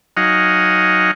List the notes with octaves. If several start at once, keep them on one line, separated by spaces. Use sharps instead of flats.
F#3 D#4 D#5 F5 F#5 G#5